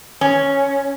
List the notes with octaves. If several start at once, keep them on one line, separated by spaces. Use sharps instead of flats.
C#4